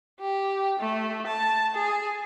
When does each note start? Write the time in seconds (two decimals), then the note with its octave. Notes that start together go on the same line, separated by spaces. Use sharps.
0.20 G4
0.80 A3
1.27 A5
1.75 G#4